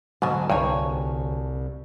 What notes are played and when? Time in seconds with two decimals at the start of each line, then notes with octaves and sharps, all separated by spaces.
0.22 D2 G#2 B2 F#3 G#5 A5
0.50 C2 G2 D#4 G#4 C#5